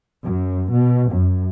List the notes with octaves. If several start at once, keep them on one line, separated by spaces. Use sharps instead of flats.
F#2
B2
F#2